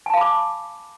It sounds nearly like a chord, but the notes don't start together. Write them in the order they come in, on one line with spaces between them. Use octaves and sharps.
G#5 A5 F5 B5 D6